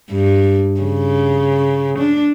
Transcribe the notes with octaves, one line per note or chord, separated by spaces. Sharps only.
G2
C#3
D4